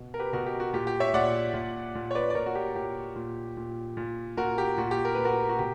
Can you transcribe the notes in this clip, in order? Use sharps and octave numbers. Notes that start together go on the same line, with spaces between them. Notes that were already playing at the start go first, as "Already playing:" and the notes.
Already playing: B2
A#4
G4 B4
B2 F#4 A#4
G4
F#4
A#2 G4
G4
C#5 E5
A#2 D5 F#5
A#2
A#2
C#5
B4 D5
D5
A#2 A#4 C#5
F#4
G4
A#2 G4
A#2
A#2
A#2
A#2 F#4 A#4
G4
A#2 F#4
G4
A#4
A#2 B4
F#4 A#4
F#4
B2 G4